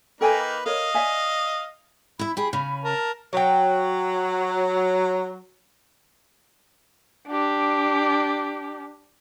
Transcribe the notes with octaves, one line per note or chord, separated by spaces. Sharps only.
A#3 D#4 A4 B4 G5 G#5
A#4 C#5 D#5 F5
D5 E5 G#5
E4 E5 B5
G4 G#4
C#3 C#4
A#4 A5
F#3 C#5 G5
D4 G4